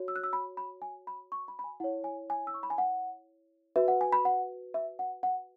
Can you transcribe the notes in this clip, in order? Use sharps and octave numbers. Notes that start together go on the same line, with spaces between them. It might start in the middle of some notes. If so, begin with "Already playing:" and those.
Already playing: F#4 C#5
E6
F#6
E6
B5
B5
G#5
B5
C#6
B5
B5
G#5
E4 C#5 F#5
G#5
G#5
E6
C#6
B5
G#5
F#5
F#4 B4 E5
F#5
G#5
B5
F#5
E5
F#5
F#5